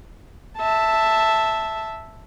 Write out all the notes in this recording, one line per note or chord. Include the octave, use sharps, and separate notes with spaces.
E5 A5